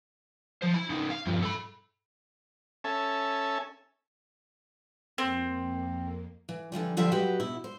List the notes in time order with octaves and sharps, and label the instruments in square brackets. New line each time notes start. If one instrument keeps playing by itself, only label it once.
[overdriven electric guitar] F3 C5
E4 B5
C#3 D#4
F5
G2 F3
A4 B5
[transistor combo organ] C#4 A4 E5 G#5 A5
[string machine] F2 A#3 [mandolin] C4
[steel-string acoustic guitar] E3
D3 E3 F3 G3
D3 F3 G3 C5 E5 F5
F#3 F#4 G4 B4 D#5
E2 B2 E4
C5